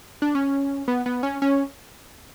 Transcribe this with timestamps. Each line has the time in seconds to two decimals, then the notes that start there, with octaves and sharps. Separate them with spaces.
0.22 D4
0.35 C#4
0.88 B3
1.06 B3
1.23 C#4
1.42 C#4